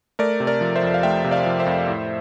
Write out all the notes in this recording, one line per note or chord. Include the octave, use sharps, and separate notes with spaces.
A3 A#4 D5
C3
A#4 D5
F3
C5 E5
F2
F5
A3 E5 G5
C3
D5 F5
F3
C5 E5
F2
A2